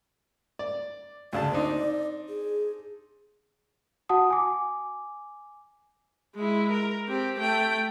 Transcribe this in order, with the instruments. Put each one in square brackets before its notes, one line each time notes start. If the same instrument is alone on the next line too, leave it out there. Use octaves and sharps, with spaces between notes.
[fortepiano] D5
[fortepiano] D2 C#3 A5 [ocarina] D5
[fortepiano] C4 D4 D#4
[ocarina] G#4
[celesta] F#4 F#5 A5 D#6
G#5 D6
[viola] G#3 E4
A#4
C4 G4
A3 G5